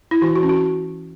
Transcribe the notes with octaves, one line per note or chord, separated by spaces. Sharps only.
E4
E3 F#4
F#4
C#4
F#4